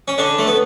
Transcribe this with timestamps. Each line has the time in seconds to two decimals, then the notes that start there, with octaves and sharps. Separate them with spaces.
0.08 C#4
0.18 D3 D4
0.39 A3
0.47 B3